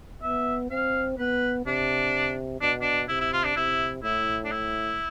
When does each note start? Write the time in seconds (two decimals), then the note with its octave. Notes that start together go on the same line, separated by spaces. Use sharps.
0.22 B3 E5
0.70 C4 F5
1.18 B3 B4
1.66 C3 D4
2.61 B2 D4
2.81 D4
3.08 C3 E4
3.20 E4
3.33 F4
3.44 D4
3.56 C3 E4
4.03 A2 E4
4.45 D4
4.51 E4